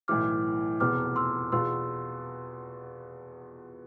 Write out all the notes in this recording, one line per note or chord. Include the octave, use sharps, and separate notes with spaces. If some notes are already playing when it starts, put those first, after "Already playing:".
B1 A2 E3 D6 F6
F1 E2 B2 B3 D6 F6
C6 E6
E2 B2 B3 F4 C6 E6